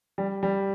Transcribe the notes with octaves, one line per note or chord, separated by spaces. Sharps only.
G3
G3